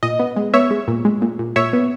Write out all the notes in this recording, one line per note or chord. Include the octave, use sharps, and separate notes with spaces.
A#2 D#5
B3
G#3
B3 C#5 E5
G#3
A#2
G#3
A#2
A#2
A#2 C#5 E5
B3